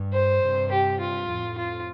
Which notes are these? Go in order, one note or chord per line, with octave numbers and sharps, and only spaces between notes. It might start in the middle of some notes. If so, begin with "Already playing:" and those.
Already playing: G2
C5
G2 C3
G4
F4
F2 A2
F4